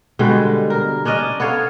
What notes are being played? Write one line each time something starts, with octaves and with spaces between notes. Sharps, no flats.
B2 D3 G3 G#3
A#4
C#4 D4 D5 D#5
B3 A4 C#5 F5